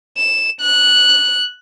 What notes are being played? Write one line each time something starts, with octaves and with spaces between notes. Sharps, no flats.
E7
F#6